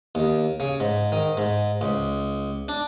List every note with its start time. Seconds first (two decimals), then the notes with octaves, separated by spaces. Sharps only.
0.15 D#2
0.60 C#3
0.80 G#2
1.12 D#3
1.37 G#2
1.81 C#2
2.68 D4